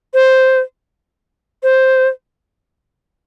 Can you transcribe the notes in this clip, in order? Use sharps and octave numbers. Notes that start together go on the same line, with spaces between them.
C5
C5